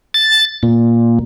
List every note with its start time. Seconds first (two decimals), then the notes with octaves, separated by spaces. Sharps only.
0.14 A6
0.63 A#2